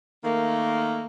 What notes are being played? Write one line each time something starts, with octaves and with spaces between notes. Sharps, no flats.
D#3 A3 A#3